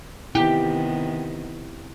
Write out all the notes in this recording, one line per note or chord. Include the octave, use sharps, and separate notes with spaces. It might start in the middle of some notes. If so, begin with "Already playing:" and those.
C3 D#3 B3 E4 G4